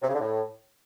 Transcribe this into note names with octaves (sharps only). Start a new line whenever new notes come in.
C3
C#3
D3
A2